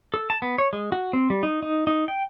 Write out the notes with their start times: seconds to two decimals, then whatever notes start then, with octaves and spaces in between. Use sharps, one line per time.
0.14 A4
0.30 A5
0.42 B3
0.58 C#5
0.73 G#3
0.92 F#4
1.13 C4
1.30 G3
1.43 D#4
1.63 D#4
1.87 D#4
2.08 G5